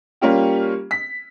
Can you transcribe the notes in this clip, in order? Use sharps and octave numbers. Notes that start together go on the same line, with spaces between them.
G3 A#3 C#4 F4 G4
B6